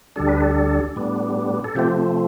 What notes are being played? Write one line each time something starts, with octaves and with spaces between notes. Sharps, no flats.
D2 D3 G3 D4 A4
B4
A4
A2 G3 B3 D4
A4
C3 F3 A3 C4 G4